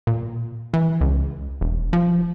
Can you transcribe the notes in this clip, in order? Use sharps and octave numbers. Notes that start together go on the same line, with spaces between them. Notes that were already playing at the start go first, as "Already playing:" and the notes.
A#2
E3
C#2
E1
F3